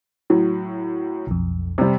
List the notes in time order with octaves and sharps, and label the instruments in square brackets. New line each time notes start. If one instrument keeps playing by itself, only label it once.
[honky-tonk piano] A2 F#3
[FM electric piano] B1 F2
[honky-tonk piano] C3 G3